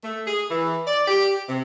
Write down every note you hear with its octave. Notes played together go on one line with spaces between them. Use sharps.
A3
G#4
E3
D5
G4
C3